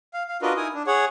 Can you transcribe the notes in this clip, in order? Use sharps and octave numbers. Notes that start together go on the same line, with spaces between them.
F5
F5
D4 F4 F#4 A#4 B4 D#5
D#4 E4 A#4 G#5 D#6
D4
G#4 C#5 F#5